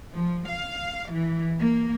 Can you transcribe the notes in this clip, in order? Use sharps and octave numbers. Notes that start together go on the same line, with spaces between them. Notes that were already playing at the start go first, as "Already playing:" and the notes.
F3
F5
E3
A#3